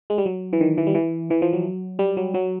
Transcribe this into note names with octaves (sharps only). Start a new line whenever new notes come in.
G#3
G3
F#3
E3
D#3
E3
G3
E3
E3
F3
F#3
G3
F#3
F#3